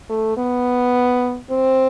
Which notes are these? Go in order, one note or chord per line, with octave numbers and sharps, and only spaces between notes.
A3
B3
C4